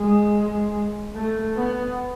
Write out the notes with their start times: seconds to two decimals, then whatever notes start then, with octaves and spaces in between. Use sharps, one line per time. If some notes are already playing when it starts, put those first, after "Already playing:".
Already playing: G#3
1.15 A3
1.56 B3